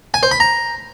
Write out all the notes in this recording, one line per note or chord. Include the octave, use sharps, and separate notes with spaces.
G#5
C5
B5
A#5